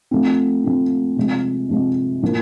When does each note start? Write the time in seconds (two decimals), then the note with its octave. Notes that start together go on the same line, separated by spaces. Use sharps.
0.11 F3 A3 C4
0.64 F3 A3 C4
1.16 C3 F3 G#3
1.69 C3 F3 G#3
2.22 A2 F3 A#3